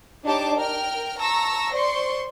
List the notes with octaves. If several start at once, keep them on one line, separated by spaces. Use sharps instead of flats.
D4 D#4 G4 C#5 A5 D6
A#4 G5 F6
A5 A#5 C#6 E6 A#6
C5 D5 C6 C#6